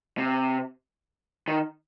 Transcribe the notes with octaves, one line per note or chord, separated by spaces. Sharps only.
C3
D#3